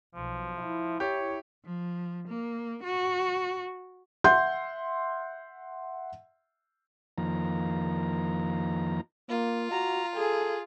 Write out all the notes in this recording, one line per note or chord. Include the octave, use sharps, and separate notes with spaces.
B1 F3
E4
G4 C#5
F3
A#3
F#4
E5 F#5 C6 G6
F2 D#3 F3 A#3 A#5
A#3 F4
F#4 A#5
G#4 A4